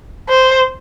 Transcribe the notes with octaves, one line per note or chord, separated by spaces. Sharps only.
C5